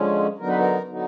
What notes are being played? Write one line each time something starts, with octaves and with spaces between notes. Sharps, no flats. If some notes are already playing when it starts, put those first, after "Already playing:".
Already playing: D3 F3 G#3 C#4
D3 F#3 B3 D#4 A#4
B4
A#4
D3 F#3 B3 D#4